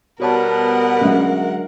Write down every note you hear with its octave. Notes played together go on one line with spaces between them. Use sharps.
B2 G3 B3 F#4 A#4 C#5 F#5 A5
D3 F#3 G#3 C#4 E5